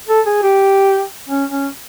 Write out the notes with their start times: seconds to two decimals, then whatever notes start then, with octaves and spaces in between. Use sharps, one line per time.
0.09 A4
0.26 G#4
0.43 G4
1.29 C#4
1.51 C#4